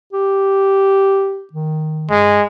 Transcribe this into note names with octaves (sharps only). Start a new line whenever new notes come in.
G4
D#3
G2 G#3